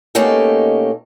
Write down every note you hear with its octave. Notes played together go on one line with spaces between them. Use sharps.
B2 A3 A#3 C#4 D#4 G4